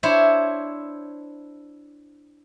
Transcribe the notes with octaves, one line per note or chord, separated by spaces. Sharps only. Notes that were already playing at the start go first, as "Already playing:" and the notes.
D4 E4 C5 C#5 E5